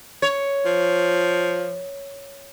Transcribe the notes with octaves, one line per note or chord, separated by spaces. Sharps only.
C#5
F3